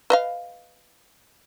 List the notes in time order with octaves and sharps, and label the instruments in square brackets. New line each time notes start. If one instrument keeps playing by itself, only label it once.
[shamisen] B4 D#5 F5